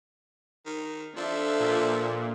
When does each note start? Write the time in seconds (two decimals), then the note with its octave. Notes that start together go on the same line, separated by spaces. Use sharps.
0.66 D#3
1.17 F3 D4 A4 E5
1.59 A#2